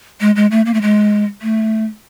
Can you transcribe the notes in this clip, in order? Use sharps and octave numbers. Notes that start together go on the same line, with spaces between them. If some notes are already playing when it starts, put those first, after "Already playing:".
G#3
G#3
A3
A#3
A3
G#3
A3